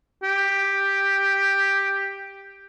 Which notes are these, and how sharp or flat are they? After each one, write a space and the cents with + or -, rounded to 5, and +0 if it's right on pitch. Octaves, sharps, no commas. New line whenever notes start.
G4 +5